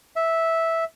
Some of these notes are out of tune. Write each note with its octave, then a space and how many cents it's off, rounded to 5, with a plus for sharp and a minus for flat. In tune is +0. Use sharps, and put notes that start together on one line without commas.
E5 -10